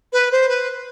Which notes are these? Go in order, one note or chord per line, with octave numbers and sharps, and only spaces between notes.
B4
C5
B4